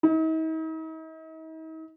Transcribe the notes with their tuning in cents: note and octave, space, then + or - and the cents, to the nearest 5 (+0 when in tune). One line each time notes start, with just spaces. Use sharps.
D#4 +45